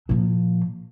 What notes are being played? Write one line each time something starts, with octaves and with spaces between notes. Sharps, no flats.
A#2 F3